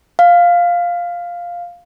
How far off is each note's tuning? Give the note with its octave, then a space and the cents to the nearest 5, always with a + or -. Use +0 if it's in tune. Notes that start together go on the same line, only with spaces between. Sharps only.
F5 +5